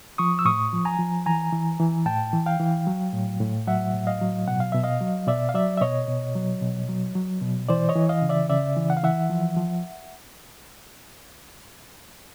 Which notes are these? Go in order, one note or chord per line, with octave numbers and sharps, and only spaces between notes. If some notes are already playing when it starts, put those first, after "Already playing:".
F3 C#6 D#6
E6
A2 C#6 D#6
F3
G#5 A#5
F3
E3 G#5 A#5
E3
E3
A2 G5 A5
E3
F5 G5
E3
F#3
A2
A2
F#3 E5 F#5
A2
D#5 F5
F#3
B2 F#5
F5
B2 E5
D#5 F5
F#3
B2 D5 E5
F5
F#3 D5 E5
E5
B2 C#5 D#5
B2
F#3
B2
F#3
F#3
B2
E3 C5 D5
C#5 D#5
E3
D#5 F5
C#3
D5 E5
C#3 D5 E5
E3
F#5
F5
E3 E5 F#5
F3
F3